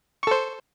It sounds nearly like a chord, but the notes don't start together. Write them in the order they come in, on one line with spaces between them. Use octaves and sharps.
C#6 A4 C5